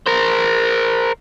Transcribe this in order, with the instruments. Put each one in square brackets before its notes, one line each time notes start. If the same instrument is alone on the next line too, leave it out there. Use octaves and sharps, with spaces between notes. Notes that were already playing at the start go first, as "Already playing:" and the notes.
[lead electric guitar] A#4 C5